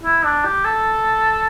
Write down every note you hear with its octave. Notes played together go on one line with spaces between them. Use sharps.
E4
D4
G4
A4